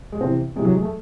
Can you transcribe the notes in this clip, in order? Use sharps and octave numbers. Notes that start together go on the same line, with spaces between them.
G#3
C3 E3 C4
C3 E3 G#3
F#3
G#3
A3